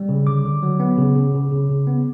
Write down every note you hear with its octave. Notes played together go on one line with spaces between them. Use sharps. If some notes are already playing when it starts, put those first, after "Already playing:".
Already playing: G3
C#3
D3 D6
D3
F#3
B3
C#3
C#3
C#3
C#3
C#3
B3